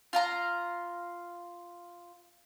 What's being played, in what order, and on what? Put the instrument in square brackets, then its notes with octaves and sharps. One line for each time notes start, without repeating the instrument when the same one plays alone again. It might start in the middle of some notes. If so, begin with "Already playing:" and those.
[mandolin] F4 F5 A#5